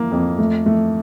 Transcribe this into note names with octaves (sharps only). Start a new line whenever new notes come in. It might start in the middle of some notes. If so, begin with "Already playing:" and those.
Already playing: A#3
F2
A3
A3